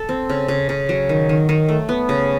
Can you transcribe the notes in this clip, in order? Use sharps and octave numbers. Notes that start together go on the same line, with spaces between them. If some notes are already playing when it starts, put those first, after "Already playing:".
Already playing: A4
C4
C#3
C#3
C#3
F#3
D#3
D#3
D#3
A3
B3
C#3